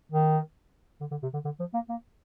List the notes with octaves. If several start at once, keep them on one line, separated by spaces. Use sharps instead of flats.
D#3
D3
D3
C3
D3
D3
F3
A#3
A#3